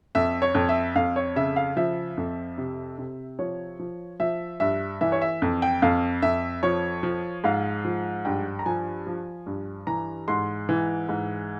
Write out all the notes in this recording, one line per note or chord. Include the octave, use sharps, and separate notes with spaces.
F2 E5
C#5
F2
E5
F2 F5
C#5
C#3 E5
F5
F3 E5
F2
C3
C3
F3 C#5
F3
F3 E5
G2 E5
E3 E5
C#5
E5
F2
G5
F2 F5
F2 E5
F3 C#5
F3
G#2 F5
F3
G2 G5
A#5
F3 G#5
F3
G2
E3 A#5
G#2 C6
E3
G#2